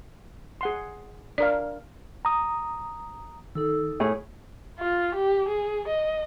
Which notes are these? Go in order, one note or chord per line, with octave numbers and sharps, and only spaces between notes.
G#4 F#5 C6
D4 A#4 D5 F5
A#5 D#6
D#3 D#4 A4 E6
A2 G#4
F4
G4
G#4
D#5